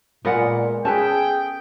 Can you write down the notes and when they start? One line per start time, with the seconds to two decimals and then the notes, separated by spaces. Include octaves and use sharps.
0.25 A#2 G#3 B3 A#4 D5 F#5
0.85 C#4 G#4 A4 B4 G5 A5